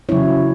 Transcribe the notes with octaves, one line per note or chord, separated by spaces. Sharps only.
C#3 F#3 C#4 E4 C#5